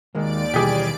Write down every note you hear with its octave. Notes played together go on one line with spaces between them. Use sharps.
D#2 D#3 G#3 A#3 D5 D7
B2 E3 G3 G4 G#4